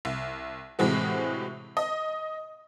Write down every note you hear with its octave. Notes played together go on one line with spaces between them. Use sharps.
C2
A2 C3 E3 G#3 C4 F#4
D#5